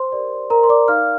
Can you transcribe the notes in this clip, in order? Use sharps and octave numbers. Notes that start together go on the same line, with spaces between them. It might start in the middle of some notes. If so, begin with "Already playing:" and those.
Already playing: C5 C6
G4 A#4 D5
A#4 A#5
C6
D5 D6
D#4 A#4 D5 F5 F6